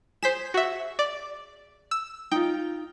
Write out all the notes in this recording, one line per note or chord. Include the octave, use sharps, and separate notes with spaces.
G#4 C5 B6 E7
F#4 E5
D5
E6
D#4 F4 G5